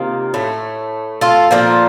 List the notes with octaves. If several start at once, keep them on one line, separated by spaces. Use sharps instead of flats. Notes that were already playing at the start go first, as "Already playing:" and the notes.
Already playing: C3 D#3 A#3 F4
A2 A3
F4 A4
A#2 F3 A#3